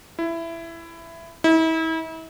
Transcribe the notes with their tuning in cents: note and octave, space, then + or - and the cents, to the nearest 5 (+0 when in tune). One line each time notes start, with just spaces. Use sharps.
E4 +15
E4 -35